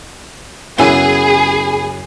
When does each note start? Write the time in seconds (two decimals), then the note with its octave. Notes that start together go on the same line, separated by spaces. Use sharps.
0.79 F#2 C#3 B3 E4 G#4 G#5